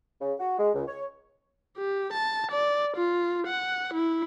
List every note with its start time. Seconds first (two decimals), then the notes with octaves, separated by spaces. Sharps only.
0.21 C#3
0.39 F#4
0.59 G#3
0.74 C#2
0.87 C#5
1.77 G4
2.13 A5
2.51 D5
2.97 F4
3.47 F#5
3.94 E4